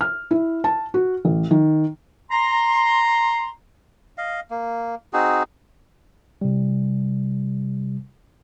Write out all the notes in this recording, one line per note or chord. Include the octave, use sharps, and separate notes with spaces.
F6
E4
A5
F#4
A1
D#3
A#5 C6
D#5 F5
A#3
C4 D#4 F#4 G#4
C3 G3